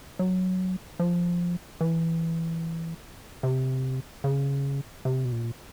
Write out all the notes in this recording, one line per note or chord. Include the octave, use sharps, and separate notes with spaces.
F#3
F3
E3
C3
C#3
C3
B2
A#2